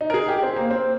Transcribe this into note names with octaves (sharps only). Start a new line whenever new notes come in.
D#4
A#4
G#4
G4
C4
A#3
C4